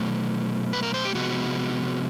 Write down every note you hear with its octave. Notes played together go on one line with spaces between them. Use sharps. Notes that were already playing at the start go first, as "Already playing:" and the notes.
Already playing: B2 F#3 A3
B4
A#4
C5
G4
C3 F3 G#3 B3 F#4